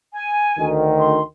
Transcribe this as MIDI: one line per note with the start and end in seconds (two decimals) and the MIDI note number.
0.12 0.68 80
0.58 1.19 38
0.58 1.19 51
0.99 1.23 84